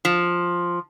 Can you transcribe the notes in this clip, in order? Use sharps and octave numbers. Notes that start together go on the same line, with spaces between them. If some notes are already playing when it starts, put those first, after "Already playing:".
F3